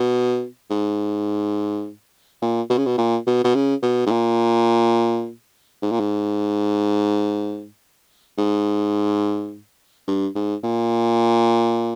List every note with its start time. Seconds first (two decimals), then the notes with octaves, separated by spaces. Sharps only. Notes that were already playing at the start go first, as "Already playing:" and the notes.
Already playing: B2
0.70 G#2
2.42 A#2
2.70 B2
2.78 C#3
2.86 B2
2.98 A#2
3.27 B2
3.44 B2
3.55 C#3
3.82 B2
4.06 G#2
4.11 A#2
5.82 G#2
5.91 A#2
6.00 G#2
8.38 G#2
10.07 G2
10.35 G#2
10.63 A#2